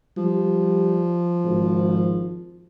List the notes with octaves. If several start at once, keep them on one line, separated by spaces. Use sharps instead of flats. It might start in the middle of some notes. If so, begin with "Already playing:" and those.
F3 G3
G#1